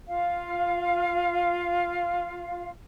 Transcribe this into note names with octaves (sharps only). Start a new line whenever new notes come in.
F4 F5